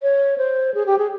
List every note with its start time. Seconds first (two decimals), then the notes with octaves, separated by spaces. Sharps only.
0.02 C#5
0.38 C5
0.74 G#4
0.86 G4
0.98 G#4